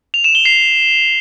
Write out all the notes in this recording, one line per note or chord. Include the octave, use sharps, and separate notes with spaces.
F7
E7
G7
C7